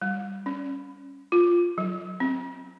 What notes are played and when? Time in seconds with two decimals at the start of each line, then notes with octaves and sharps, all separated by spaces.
0.02 G3
0.46 C#4
1.32 F4
1.78 F#3
2.20 C4